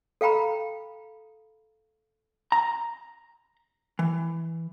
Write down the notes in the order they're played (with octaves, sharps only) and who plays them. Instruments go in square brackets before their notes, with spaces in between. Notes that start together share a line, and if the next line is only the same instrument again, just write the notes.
[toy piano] A4 F5 G5 A#5 B5
[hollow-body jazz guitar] A#5
E3